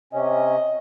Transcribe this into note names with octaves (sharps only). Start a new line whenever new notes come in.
C3 C#4 D#5